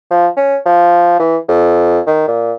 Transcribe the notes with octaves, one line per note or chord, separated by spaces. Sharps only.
F3
C#4
F3
E3
F2
D#3
A#2